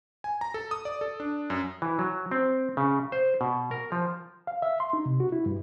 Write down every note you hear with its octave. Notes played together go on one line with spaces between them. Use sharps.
G#5
A#5
A4
D#6
D5
A4
D4
F#2
E3
F#3
C4
C#3
C5
B2
A#4
F3
F5
E5
C6
D#4
C3
F#4
E4
G2